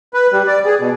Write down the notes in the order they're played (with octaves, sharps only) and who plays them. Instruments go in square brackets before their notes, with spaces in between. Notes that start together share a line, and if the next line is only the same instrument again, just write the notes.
[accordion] B4
G3
D5
G#4
B2